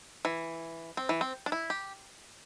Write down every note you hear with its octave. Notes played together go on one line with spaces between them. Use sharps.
E3
C4
E3
C4
D4
E4
G4